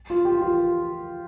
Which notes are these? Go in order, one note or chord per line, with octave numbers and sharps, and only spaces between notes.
F4
F4 G4
F4